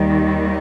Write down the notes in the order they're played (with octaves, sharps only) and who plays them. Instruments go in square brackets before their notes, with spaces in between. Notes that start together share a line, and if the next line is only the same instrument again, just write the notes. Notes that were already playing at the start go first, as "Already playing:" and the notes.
Already playing: [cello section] D#2 D#3 G3